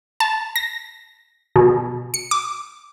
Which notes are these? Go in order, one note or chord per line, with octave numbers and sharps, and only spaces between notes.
A5
A#6
B2
C#7
D6